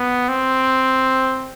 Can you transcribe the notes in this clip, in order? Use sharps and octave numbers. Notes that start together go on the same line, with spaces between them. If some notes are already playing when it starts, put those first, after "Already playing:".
Already playing: B3
C4